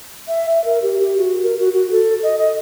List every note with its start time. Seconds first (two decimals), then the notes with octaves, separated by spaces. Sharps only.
0.28 E5
0.50 E5
0.65 A#4
0.82 G4
1.00 G4
1.18 F#4
1.43 A#4
1.59 F#4
1.74 F#4
1.91 A4
2.23 D#5
2.38 D#5